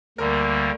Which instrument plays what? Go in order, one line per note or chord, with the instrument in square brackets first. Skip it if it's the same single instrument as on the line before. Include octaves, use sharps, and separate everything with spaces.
[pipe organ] D2 D3 G3 A#3 [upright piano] A#4